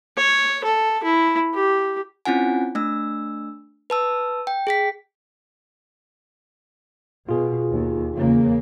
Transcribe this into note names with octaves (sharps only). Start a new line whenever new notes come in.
C#5
A4
E4
G4
C4 C#4 E4 F4 F#5 G#5
A3 D4 E6
B4 A5 E6
G5
G#4 G5 B6
B2 F4 G#4
D#2
E2 C#3 A#3